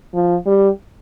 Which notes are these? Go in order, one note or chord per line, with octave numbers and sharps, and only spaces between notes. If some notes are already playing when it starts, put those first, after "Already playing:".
F3
G3